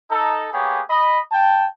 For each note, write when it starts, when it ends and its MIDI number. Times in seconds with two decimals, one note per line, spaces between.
0.10 0.48 63
0.10 0.48 69
0.52 0.81 58
0.52 0.81 59
0.52 0.81 67
0.52 0.81 68
0.52 0.81 73
0.90 1.20 75
0.90 1.20 83
1.32 1.67 79
1.32 1.67 81